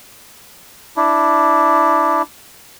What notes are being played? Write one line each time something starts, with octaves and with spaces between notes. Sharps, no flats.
D4 E4